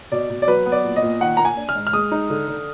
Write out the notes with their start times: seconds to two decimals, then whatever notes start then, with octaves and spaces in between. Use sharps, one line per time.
0.12 B2 D5
0.30 B2
0.42 D5
0.48 F#3 B4
0.66 B3
0.72 D5
0.84 A#2
0.96 D#5
1.02 A#2
1.21 D#3 F#5
1.37 A#3 A#5
1.45 G#5
1.57 D4
1.69 F6
1.75 G#2
1.87 F6
1.93 G#3 D#6
2.12 D#4
2.30 D3
2.48 D3